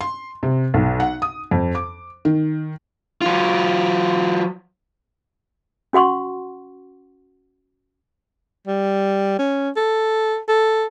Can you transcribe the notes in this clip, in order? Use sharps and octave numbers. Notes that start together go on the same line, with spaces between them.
C6
C3
B1
F#5
D#6
F2
D6
D#3
F#3 F4
C#4 F#4 F#5 C6 C#6
G3
C#4
A4
A4